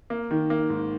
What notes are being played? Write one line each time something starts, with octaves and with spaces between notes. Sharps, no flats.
A#3
D#3
A#3
G#2